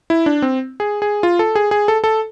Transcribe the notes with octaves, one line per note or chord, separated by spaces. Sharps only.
E4
D4
C4
G#4
G#4
F4
A4
G#4
G#4
A4
A4